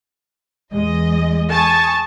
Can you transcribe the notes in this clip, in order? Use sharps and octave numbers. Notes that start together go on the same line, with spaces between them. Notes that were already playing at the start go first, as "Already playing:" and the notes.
E2 G#3 D#5
G#5 A5 C#6 D#6